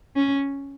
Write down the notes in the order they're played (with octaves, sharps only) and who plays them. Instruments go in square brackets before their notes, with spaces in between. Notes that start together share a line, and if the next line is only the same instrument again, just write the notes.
[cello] C#4